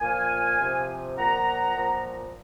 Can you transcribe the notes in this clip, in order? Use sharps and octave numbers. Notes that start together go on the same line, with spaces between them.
A#2 F3 F5 G#5
C3 F3
A#2 F3 F#5 A#5
A#2 F3